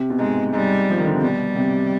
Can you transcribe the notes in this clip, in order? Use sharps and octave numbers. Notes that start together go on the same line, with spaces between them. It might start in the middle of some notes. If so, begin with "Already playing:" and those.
Already playing: C3
B2
G#2 G#3
G#2 G3
F3
D#3
D3
C3
B2 G3
C3